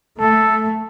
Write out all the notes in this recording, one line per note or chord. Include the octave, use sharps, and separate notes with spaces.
A3 A4